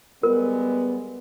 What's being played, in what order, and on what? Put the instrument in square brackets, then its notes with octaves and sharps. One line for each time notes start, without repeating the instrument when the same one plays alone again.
[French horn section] G3 G#3 B3 [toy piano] A#4